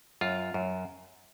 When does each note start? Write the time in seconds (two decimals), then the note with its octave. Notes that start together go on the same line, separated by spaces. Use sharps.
0.21 F#2 F4
0.54 F#2